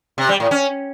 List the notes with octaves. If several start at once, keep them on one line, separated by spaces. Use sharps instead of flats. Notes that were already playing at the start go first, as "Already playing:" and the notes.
C3
G3
A2
C#4